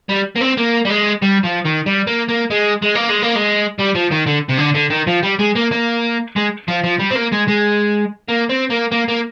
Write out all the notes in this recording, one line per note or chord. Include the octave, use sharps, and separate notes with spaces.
G3
A#3
C4
A#3
G3
G#3
G3
F3
D#3
G3
A#3
A#3
G#3
G#3
A#3
G#3
A#3
G#3
G3
F3
D#3
D3
C3
D3
D3
D#3
F3
G3
G#3
A#3
A#3
G#3
F3
F3
G3
C4
A#3
G#3
G#3
A#3
C4
A#3
A#3
A#3